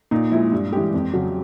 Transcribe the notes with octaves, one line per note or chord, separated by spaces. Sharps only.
A#2 D#4
F3 G#3 E4
G2
E3 G#3 G4
F2
C#3 F#3